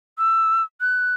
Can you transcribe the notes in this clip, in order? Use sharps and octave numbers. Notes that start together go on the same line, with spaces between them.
E6
F#6